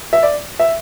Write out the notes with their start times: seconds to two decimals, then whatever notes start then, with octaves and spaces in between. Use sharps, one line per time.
0.13 E5
0.23 D5
0.59 E5